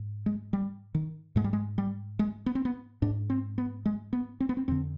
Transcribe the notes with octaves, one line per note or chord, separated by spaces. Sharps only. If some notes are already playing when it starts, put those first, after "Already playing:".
Already playing: G#2
G#3
G3
D#3
G#2 G#3
G3
G#3
G3
G#3
B3
C4
B3
G#2 D4
C4
B3
G#3
B3
C4
B3
C4
F2 D3 C4